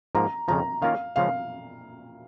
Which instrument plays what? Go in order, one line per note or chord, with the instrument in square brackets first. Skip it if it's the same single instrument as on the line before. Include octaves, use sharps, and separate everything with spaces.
[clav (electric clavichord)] G#2 F3 A#3 [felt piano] A#5
[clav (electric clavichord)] F2 C#3 F3 [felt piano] A#5
[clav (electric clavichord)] D#3 A#3 C#4 F4 A#4 [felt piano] F5
[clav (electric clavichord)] C#3 F3 G#3 C#4 [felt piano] F5